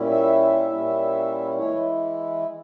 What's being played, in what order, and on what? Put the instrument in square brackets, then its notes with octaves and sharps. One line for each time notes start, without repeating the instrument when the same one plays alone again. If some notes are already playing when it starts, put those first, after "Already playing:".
Already playing: [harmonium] A#2 G3 C#4 E4
E5
E5
A#2 G3 C#4 E4
E3 G#3 E4 C#5